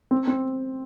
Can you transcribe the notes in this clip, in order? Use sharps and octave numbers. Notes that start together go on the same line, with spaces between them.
C4
C4